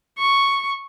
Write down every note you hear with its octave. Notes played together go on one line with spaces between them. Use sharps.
C#6